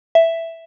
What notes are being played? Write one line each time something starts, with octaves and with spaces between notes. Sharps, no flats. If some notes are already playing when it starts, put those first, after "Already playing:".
E5